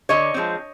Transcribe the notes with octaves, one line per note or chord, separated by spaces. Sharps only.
D3 C#5 D#5
F3 G#3 C4